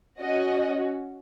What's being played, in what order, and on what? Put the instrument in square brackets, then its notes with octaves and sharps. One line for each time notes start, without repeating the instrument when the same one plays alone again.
[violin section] C#4 F#4 D#5